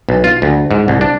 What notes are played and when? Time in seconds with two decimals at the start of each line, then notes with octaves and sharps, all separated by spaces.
0.09 B1
0.24 F4
0.42 D2
0.71 G#2
0.88 C2
1.01 D4